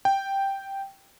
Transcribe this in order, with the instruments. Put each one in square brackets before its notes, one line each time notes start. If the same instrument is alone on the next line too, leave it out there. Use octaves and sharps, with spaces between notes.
[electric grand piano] G5